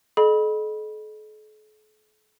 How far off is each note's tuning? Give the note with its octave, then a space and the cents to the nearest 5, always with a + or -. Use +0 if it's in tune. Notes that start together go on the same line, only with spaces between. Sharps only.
A4 -45 D#5 -25 B5 -20